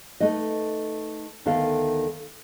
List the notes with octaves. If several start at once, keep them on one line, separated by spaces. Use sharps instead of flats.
A3 D#4 B4 D#5
D2 D#3 B3 A4 F5